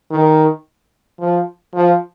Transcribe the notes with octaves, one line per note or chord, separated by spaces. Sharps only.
D#3
F3
F3